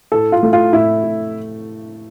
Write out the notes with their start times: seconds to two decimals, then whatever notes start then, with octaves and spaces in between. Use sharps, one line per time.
0.12 A2 A4
0.32 F4
0.43 A3
0.53 F4
0.72 A2 E4
1.04 A2